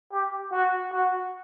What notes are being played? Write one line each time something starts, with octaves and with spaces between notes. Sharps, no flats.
G4
F#4
F#4